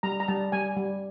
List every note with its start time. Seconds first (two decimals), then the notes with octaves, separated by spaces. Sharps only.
0.03 G3 A#5
0.20 A#5
0.28 G3 A5
0.52 G3 G#5
0.77 G3